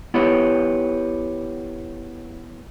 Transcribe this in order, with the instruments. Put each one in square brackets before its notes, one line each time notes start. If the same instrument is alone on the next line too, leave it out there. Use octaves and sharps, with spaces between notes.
[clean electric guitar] B3 E4 G4 B4 C#5